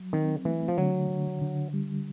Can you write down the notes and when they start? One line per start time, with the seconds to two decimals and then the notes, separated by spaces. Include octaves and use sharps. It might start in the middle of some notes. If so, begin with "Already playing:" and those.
Already playing: F#3
0.13 D#3 C4
0.45 E3 A3
0.68 F3
0.78 D3 F#3
1.10 D3
1.42 D3
1.74 G3